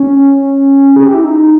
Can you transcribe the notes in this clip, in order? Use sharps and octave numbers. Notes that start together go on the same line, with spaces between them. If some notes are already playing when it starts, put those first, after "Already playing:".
Already playing: C#4
G#4
G4
E4
D#4